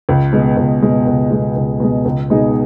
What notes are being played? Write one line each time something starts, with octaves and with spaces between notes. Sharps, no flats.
C#2
B2 G#3
C#2
B2 G#3
C#2
B2 G#3
C#2
B2 G#3
C#2
B2 G#3 D#4 G#4